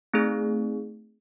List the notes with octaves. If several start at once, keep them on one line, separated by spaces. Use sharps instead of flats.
A3 C4 D#4 G#4